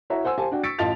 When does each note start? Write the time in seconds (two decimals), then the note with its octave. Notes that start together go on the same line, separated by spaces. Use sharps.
0.10 E4 F#4 C#5 E5 A#5
0.25 C5 F#5 G#5 E6
0.38 G4 C5 F5 G#5 A5
0.52 D4 F#4 G5
0.63 C#6 E6 A6 B6 C#7 D7
0.79 A1 F4 D#5 A5 A6 F7